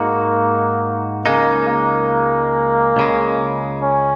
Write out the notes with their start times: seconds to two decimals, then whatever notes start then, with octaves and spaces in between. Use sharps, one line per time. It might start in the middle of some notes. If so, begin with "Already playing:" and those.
Already playing: G#2 G#3 A#3 D#4 F#4
1.26 C#2 C#3 G#3 A#3 D#4
1.68 A#3
2.97 C#2 C#3 G#3
3.82 C#4